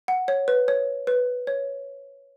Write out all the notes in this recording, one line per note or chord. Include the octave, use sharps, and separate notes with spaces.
F#5
C#5
B4
C#5
B4
C#5